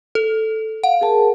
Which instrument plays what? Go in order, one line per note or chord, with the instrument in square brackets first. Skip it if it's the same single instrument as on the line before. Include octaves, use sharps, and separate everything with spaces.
[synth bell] A4
[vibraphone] F5 [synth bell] F#5
[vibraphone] G#4 A#4 A5